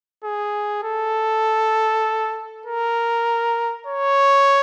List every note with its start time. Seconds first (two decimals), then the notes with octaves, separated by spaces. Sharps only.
0.24 G#4
0.84 A4
2.66 A#4
3.87 C#5